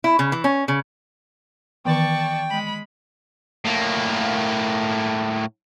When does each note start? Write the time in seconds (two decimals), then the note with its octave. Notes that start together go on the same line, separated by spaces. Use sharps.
0.04 E4
0.19 C#3
0.32 E3
0.44 C#4
0.68 C#3
1.85 D#3 E3 B3 D5 G5 A5 C#6
2.49 G#3 B5
3.65 A2 A#3